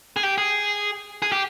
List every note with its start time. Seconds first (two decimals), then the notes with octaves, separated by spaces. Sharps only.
0.16 G#4
0.23 G4
0.38 G#4
1.22 G#4
1.32 G4